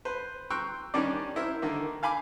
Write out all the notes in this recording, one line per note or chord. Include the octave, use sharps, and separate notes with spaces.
B4 C5
G5 A#5 C6 C#6 E6 F#6
D#3 G3 C#4 D4 D5
E4 A#4 C5 E5
D3 D#3 A#3
F5 G#5 B5 D6